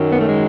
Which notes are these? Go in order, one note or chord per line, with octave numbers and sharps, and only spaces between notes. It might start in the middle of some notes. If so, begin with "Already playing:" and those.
Already playing: F#2 D#3 F#3
B3
A3
G#3